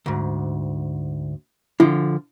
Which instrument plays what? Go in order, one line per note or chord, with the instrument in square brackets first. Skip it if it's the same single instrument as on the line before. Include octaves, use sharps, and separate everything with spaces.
[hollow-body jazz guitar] D2 G#2
[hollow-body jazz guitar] D3 F3 [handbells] E4